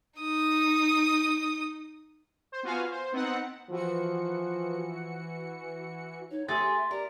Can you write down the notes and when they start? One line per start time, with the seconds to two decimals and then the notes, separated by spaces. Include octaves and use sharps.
0.20 D#4 D#6
2.52 C5
2.63 B3 F4 F#4 F5 G#5
2.91 C5
3.12 B3 C4 D#4 F#5
3.70 E3 F3 F#4 C#7
6.31 D#4 C#5
6.48 A3 G4 G#4 E5 C6 A6
6.91 G4 A#4 D5